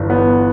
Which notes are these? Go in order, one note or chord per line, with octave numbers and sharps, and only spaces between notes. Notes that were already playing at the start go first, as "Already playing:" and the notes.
Already playing: G1 G2 E3
B3